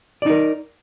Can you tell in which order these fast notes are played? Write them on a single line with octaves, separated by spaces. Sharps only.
D5 D#4 A#4